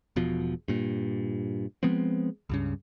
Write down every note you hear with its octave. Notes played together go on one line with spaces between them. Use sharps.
E1 B2 F3
G2 A#2
F3 G#3 B3 C4
C#2 G2 C#3